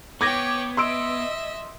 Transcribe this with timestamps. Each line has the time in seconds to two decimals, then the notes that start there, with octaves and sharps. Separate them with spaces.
0.21 B3 C#5 G5 D6 G#6 A#6
0.77 D#5 E5 C6 E6 D7